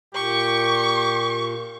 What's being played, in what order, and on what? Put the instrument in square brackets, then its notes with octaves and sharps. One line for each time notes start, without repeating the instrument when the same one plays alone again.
[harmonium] A#2 [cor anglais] G4 [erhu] C#6